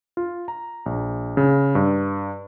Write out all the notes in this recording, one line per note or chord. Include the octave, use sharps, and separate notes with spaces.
F4
A#5
A#1
C#3
G2